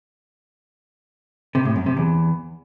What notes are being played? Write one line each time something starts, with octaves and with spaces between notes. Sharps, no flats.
C3
A2
F#2
C3
E2